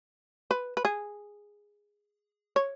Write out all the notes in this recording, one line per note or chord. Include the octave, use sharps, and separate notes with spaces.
B4
B4
G#4
C#5